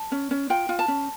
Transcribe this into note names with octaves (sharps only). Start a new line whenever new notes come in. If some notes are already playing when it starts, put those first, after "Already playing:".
Already playing: A5
C#4
C#4
F4 G5
F4
A5
C#4